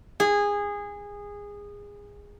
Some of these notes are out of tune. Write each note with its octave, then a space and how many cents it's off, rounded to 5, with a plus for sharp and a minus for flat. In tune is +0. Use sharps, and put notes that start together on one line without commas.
G#4 -20